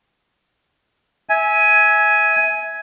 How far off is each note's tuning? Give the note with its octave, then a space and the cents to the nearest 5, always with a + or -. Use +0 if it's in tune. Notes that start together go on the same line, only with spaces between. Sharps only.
E5 -20 G#5 +10